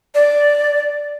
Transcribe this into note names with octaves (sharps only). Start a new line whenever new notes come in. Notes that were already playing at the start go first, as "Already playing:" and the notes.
D5